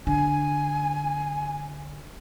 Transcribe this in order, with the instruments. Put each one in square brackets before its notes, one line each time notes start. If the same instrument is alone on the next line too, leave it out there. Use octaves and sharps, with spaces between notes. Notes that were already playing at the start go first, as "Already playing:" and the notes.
[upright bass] D3 [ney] G#5